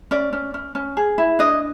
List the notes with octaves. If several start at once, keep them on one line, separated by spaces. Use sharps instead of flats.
C#4 D5
C#4
C#4
C#4
G#4
E4
D4 D#5